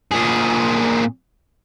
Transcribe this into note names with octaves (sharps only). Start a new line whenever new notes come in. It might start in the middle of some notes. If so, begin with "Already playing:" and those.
A#2 G#4